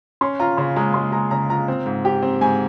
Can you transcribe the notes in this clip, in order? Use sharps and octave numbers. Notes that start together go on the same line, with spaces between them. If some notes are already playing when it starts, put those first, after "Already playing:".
C#4 C6
F4 A#5
C#3 C6
G#3 A#5
G#3 C6
G#3 A#5
C#3 A#5
F4 A#5
C4
G#2
G4
C4
G#2 G#5